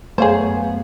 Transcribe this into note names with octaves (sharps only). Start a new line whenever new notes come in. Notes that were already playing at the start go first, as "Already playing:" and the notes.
F#2 A3 B3 G#4 C5 C#5 F5